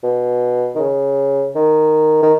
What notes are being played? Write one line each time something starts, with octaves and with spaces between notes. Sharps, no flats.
B2
D#3
C#3
D#3
D#3